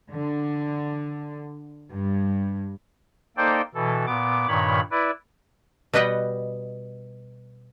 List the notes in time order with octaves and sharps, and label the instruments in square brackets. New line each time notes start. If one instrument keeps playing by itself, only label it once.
[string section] D3
G2
[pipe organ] A#3 D#4 A4 C5 D5 G5
B2 E3 A4
A#2 B3 D6
G2 A#2 D#3 C#5 B5
E4 B4 D5
[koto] B2 G3 B4 D#5 F#5 G5